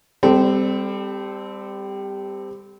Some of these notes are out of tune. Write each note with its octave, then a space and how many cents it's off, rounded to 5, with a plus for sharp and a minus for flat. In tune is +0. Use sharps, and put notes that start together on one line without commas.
G3 +15 C4 -20 A4 -5